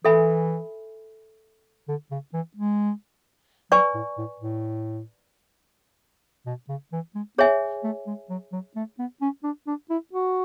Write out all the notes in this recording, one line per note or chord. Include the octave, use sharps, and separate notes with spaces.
E3 A4 E5 G#5 B5
D3
C#3
E3
G#3
F#3 B4 D5 G#5 C#6
A2
A2
A2
B2
C#3
E3
G#3
B3 G#4 C#5 E5 G#5
A3
G#3
F#3
F#3
A3
B3
C#4
D4
D4
E4
F#4